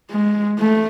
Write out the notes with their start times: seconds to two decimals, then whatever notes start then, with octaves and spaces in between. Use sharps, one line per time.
0.11 G#3
0.59 A3